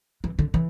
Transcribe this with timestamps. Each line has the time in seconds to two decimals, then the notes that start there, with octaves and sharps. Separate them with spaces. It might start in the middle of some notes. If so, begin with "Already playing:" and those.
0.24 E3
0.39 D3
0.54 E3